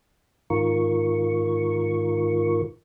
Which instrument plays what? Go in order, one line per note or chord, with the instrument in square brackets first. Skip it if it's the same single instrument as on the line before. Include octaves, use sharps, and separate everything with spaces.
[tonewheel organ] G#2 D#3 F4 A#4 C#6